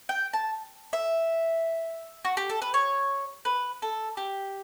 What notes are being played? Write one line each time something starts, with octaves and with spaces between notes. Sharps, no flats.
G5
A5
E5
F#4
G4
A4
B4
C#5
B4
A4
G4